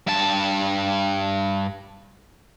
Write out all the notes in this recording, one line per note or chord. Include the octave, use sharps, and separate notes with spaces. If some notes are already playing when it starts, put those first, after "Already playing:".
G2 A5